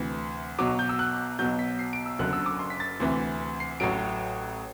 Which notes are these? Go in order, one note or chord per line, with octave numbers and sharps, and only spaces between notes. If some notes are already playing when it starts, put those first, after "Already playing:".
Already playing: D2 C3 E3
B1 B2 F#3 D6
G6
E6
F#6
B1 B2 F#3 G6
B6
C7
D7
E6
F#1 F#2 D3 F#3 F#6
E6
D6
C6
B6
A6
D2 C3 E3
C7
A1 A2 F#3 D7